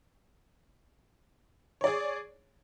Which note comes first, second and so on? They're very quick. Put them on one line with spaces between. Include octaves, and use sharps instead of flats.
C#5 D5 G#4